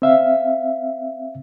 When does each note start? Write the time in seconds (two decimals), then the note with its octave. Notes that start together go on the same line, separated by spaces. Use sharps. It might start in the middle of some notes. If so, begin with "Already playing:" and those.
0.02 C4 E5 F5